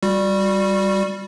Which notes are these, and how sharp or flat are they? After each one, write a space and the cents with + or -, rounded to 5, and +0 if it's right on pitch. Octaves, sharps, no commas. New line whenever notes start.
G3 +0 F#4 -25